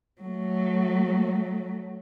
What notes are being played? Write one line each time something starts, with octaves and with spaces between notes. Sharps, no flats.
F#3 A3